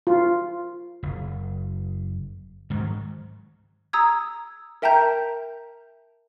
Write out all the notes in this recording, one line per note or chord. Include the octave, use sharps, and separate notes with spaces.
F4
F#1
G#2 D#3 F#3
A#5 D#6 E6 G#6
A#4 E5 G5 A5 A#5 G6